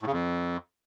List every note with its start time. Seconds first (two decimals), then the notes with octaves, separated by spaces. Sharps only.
0.01 A2
0.07 C#3
0.12 F2